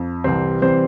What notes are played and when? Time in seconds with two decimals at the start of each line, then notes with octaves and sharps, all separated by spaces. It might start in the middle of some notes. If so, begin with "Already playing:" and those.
Already playing: F2
0.24 C2 C3 E3 G3 C4 C5
0.62 C3 E3 G3 C4 C5